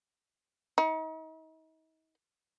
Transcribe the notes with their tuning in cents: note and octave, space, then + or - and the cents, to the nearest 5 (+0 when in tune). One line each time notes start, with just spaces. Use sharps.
D#4 +40